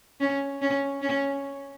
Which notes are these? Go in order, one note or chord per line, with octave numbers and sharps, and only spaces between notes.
C#4
C#4
C#4